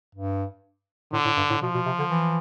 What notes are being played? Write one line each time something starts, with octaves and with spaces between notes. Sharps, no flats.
G2
A2 D3
A2
G2
A2
B2 F3
B2
C3
D3
E3